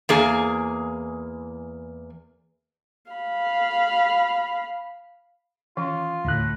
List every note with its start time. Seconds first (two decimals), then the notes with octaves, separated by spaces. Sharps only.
0.09 E2 A#3 G#4
3.11 F5 B5
5.77 D#3 E3 C#4 F4
6.25 D2 A2 F#6